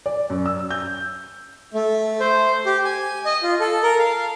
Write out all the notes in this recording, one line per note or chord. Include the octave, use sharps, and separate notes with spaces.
D5
F#2
E6
G6
A3
C5
G4
G#5
D#5
F4
A4
A#4
F5